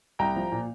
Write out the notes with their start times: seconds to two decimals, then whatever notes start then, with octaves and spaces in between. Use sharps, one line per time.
0.19 C2 G5 A#5
0.36 F3
0.52 A#2